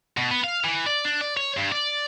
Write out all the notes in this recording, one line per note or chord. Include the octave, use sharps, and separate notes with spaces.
B2
B3
F5
E3
D5
D4
D5
C#5
G2
D5